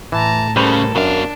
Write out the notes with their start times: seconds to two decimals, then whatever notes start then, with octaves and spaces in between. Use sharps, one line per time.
0.12 A2 E3 A5 A#5
0.56 C#3 G3 A#3 A4 B4 C5
0.96 F#2 B2 D4 A#4 F5